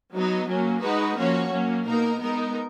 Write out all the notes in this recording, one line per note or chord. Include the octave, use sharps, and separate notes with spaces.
F#3 B3 D#4
F#3 A#3 C#4
G#3 D#4 F#4 B4
F3 A#3 C#4 F#4 C#5
F#3 A#3 C#4
B2 A#3 D#4 A#4
G#3 B3 D#4 A#4